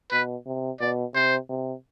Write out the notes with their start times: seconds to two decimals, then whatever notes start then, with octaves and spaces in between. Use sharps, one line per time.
0.12 B2 B4
0.47 C3
0.81 B2 D5
1.14 C3 C5
1.49 C3